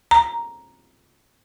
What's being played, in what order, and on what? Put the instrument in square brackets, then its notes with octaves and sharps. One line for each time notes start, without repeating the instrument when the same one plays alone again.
[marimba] A#5